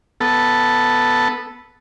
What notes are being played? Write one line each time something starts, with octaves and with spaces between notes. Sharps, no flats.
B3 A4